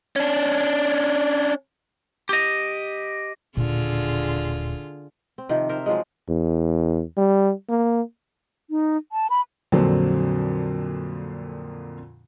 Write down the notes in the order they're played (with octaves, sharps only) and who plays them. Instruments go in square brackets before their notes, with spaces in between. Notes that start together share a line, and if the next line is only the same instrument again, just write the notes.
[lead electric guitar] C#4 D4
G4 D#5
[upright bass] D#1 [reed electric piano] A#2 [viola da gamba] D3 F4 G#4
[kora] C4
C3 D#3 F3 G4
A#4 C5 E5
F3 F#3 G#3
[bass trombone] E2
G3
A#3
[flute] D#4
A5
B5
[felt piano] F2 A#2 D3 F#3 C4